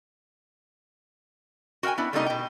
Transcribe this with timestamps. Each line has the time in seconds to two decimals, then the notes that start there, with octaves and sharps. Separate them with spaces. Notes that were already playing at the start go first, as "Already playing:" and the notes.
1.83 F#4 A#4 F5 G5 G#5
1.98 B3 D4 E4
2.13 C3 G3 A3 A#3 D#4 D#5
2.26 B2 G5